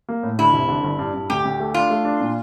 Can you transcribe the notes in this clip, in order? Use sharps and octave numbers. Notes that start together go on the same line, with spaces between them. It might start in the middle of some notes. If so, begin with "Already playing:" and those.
A#3
A2
D3 E4
F1
D3
G1
G2
G2
D2 G4
D2
A3
D4 F4
A3
D4
A#2